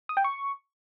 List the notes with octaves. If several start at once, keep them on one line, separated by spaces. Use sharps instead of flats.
D#6
G5
C#6